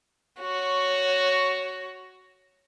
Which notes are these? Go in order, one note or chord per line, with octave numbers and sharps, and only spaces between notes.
F#4 C#5